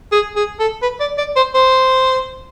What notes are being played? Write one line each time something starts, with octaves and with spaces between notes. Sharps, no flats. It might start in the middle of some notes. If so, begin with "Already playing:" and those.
G#4
G#4
A4
B4
D5
D5
C5
C5